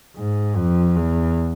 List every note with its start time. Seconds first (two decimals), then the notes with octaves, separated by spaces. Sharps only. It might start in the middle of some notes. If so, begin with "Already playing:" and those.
0.16 G#2
0.56 F2
0.95 E2